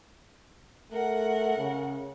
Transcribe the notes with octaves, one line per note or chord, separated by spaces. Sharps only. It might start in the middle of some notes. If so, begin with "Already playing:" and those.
A3 A#4 F#5
C#3